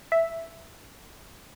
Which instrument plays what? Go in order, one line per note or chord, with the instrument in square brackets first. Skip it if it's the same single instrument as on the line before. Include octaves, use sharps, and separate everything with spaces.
[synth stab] E5